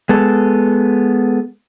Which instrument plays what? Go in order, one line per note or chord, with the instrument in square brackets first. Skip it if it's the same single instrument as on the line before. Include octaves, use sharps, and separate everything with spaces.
[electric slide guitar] G#3 B3 A4